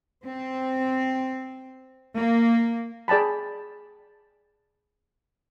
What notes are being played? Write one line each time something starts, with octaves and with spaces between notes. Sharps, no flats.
C4
A#3
G#4 D5 G5 A5 B5